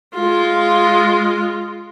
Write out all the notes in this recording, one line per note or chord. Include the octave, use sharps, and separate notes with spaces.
G#3 F4